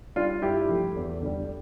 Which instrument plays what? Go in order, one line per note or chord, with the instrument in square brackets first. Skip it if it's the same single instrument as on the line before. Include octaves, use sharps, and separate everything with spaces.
[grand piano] G3 D4 F4
G2 E4 G4
F3 A3
E2
D3 G3